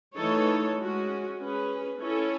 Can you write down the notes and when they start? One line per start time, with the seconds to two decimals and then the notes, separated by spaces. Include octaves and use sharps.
0.15 E3 A3 D#4 A4 C#5
0.77 G#3 C#4 F#4
1.38 C#4 G#4 B4
1.99 C#4 E4 A4 C#5